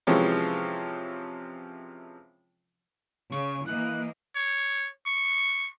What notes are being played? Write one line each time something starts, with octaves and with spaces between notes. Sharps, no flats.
C3 E3 F3 G#3 C#4
C#3 C#6
E3 A#3 D#5 F#6
C#5
C#6